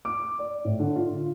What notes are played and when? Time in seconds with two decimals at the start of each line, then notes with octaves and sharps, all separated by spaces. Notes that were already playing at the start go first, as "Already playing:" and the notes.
0.05 D6
0.39 D5
0.65 A2
0.79 D3
0.96 F4